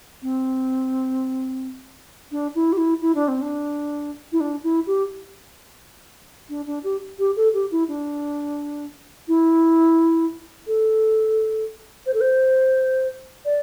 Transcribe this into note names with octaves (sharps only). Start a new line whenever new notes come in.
C4
D4
E4
G4
E4
E4
D4
C4
D4
E4
D4
E4
G4
D4
D4
G4
G4
A4
G4
E4
D4
E4
A4
C5
A4
C5
D5